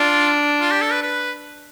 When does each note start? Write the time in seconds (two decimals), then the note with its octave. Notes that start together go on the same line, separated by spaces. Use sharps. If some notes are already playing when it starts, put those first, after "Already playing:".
Already playing: D4 F4
0.61 F4
0.72 G4
0.81 A4
0.92 B4
1.03 B4